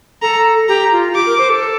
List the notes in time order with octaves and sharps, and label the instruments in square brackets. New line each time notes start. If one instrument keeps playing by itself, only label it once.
[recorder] A4 [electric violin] A#5
[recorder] G4 [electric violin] A#5
[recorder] F4
[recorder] G4 [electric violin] D6
[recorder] A#4
C5
A4